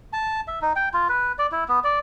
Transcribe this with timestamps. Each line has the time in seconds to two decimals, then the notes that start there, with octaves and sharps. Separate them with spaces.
0.13 A5
0.48 E5
0.62 D#4
0.76 G5
0.94 F4
1.09 B4
1.38 D5
1.52 E4
1.68 B3
1.84 D5